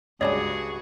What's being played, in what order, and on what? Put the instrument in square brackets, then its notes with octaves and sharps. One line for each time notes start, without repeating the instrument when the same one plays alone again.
[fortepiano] C#2 D6 [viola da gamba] G2 F#4 [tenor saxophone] G#4 [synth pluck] C#5 D5 G#5